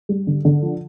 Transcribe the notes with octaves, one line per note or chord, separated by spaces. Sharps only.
G3
D3
D3
F3